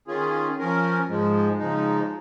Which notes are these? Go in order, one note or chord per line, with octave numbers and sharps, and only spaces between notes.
D#3 C#4 F4 G#4
F3 C#4 A#4
G#2 F3 G#3
C#3 F3 G#3 D#4